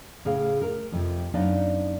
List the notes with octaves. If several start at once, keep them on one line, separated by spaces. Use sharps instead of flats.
A2 C#3 G#4 F5
A#4
F2 C3 F3
F#2 B3 D4 D#4 D5 F5